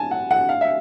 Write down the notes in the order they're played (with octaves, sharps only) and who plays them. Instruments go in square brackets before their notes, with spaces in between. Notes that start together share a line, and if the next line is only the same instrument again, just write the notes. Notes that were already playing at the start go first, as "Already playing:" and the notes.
Already playing: [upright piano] G#5 A5
F#5
F#5
F5
E5